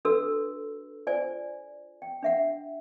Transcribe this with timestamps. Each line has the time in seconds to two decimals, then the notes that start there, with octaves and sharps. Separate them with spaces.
0.05 D4 F#4 A4 B4 E6
1.07 F4 C5 D5 G#5
2.02 G5
2.23 D4 E5 F#5